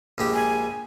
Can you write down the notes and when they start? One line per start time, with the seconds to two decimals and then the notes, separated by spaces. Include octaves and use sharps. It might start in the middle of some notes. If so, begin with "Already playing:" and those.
0.18 A#1 G#3 G4
0.33 G#5